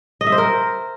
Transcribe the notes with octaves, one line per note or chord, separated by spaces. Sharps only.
D#5
E5
C5
A#4